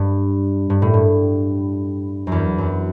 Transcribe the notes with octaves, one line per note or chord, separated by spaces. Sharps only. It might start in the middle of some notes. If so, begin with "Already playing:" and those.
Already playing: G2
G2
A2
G2
F#2
E2
F#2